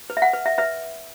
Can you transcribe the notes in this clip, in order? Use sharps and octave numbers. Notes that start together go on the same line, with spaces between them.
B4
E5
F#5
B4
E5
B4 E5